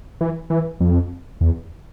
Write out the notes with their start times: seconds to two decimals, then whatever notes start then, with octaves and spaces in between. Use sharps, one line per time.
0.21 E3
0.50 E3
0.80 F2
1.41 E2